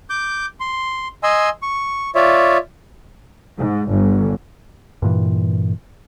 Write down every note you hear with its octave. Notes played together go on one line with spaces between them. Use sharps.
D6 G6
C6
D#5 G#5 C6 E6
C#6
F4 C#5 D5 E5
G#2
G1
G2 A#2 E3